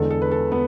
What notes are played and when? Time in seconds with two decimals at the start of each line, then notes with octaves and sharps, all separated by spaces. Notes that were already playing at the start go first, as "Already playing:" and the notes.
Already playing: E2 D3 G#3 A4
0.10 A4
0.22 B4
0.31 A4
0.51 B3 B4